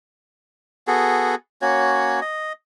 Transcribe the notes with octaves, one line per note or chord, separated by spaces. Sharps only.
B3 F#4 G#4 A4
A#3 C#4 F#4 C#5
D#5